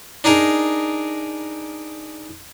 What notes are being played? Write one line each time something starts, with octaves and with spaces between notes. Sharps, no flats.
D4 D#4 G#4 A#4